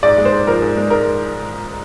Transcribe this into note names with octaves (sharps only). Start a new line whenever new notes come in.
G#2 D5
G#3
C5
G#2
F3 A#4
G#2
G#3
G#2 A#4